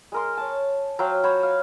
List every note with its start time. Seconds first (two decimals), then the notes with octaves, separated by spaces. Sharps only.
0.12 G#3 A#4 C6
0.37 C#5 A5
0.99 F#3 C5 F5 G5
1.24 F#4 C5 C#5 B5
1.43 F5